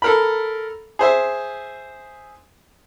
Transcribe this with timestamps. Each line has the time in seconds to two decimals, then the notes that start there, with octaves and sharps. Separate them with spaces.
0.02 A4 A#4 B5
0.99 G#4 C5 E5